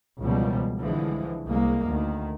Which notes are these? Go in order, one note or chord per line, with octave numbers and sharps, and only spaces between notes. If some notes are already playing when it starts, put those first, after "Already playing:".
C#2 B2 E3 F3 G3 A#3
C2 D3 E3 F3 G#3
C2 G#3 A#3
D2 D#3